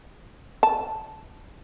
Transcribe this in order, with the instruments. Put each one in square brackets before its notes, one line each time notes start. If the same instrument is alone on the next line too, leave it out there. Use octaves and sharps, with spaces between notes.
[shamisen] A5